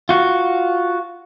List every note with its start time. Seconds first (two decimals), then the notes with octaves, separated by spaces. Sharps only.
0.09 F4 F#4